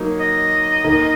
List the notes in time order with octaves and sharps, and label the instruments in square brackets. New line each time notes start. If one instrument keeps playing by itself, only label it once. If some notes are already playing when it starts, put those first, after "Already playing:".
Already playing: [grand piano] F#3 A#3 D#4
[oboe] D#5
[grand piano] D#3 A#3 D#4 A#4